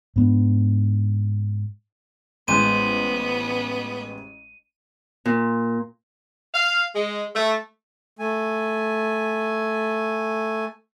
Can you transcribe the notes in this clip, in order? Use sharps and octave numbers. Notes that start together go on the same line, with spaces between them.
G#2 B3 D4
A1 G#3 B3 C5 F#6 D#7
A#2
F5
G#3
A3
A3 G#5